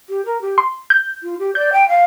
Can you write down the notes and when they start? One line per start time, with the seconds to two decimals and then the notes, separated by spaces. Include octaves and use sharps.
0.09 G4
0.25 A#4
0.41 G4
0.58 C6
0.90 G6
1.23 F4
1.39 G4
1.55 D5 G6
1.73 G5
1.88 F5